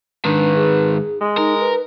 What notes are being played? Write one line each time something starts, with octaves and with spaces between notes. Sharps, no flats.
G#2 D#3 D4 B4
G#4
G#3
D#4 A#4
B4